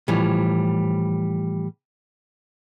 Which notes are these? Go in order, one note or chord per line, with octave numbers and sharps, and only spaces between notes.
A2 E3 F3 G3